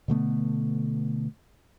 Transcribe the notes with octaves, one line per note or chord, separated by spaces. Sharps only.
B2 D3 A3 B3